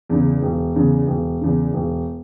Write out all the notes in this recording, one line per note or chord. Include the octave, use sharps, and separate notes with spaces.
E2 C#3
E1
E2 C#3
E1
E2 C#3
E1